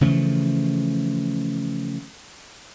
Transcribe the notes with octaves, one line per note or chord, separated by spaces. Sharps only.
C#3 E3 F3 A3